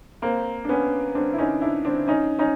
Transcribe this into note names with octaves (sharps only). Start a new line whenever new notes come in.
A#3 C4
D4
B3 C#4
C4 D4
E4
C#4 D#4
D4 E4
C4 D4
C#4 D#4
C#4 D#4